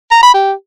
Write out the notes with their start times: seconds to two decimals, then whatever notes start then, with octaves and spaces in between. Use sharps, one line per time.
0.12 A#5
0.23 B5
0.34 G4